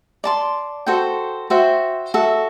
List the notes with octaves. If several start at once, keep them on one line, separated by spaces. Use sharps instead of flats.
D5 A5 C6
F#4 A4 C5 G5
F#4 C5 E5 G5
F#4 A4 E5